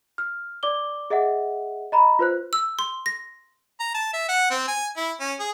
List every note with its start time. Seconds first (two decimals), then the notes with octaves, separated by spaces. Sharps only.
0.18 F6
0.63 D5 D6 G7
1.10 G#4 D#5 E5 F#5
1.92 D#5 A#5 B5
2.19 F4 B4 C5 F#6
2.53 E6
2.79 C6
3.06 A#6
3.80 A#5
3.94 A5
4.14 E5
4.29 F#5
4.51 C4
4.68 G#5
4.97 E4
5.20 C#4
5.40 G#4